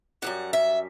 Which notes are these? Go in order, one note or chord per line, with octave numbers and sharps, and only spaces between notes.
F#2 C#3 G3 F#5
E5